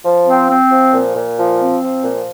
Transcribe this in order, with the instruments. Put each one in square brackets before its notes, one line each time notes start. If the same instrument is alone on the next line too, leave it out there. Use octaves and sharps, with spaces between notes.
[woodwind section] F3
C4
C4
F3
A#2
A#2
F3
C4
F3
A#2